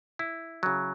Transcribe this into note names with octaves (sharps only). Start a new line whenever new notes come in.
E4
C#3 F#3